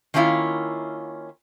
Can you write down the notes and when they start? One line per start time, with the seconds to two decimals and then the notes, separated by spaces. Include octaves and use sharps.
0.14 D#3 A#3 C#4 E4 F4